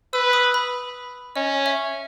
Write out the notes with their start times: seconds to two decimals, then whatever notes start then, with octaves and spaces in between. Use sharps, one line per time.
0.13 B4 E6
0.33 D#6
0.54 B5
1.36 C#4 D#5
1.66 E5